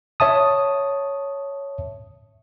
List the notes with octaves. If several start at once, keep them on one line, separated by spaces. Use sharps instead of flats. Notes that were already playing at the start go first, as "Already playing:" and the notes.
C#5 E5 A5 D#6